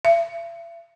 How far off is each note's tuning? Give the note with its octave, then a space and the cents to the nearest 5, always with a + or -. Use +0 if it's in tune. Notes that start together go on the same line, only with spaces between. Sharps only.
E5 +40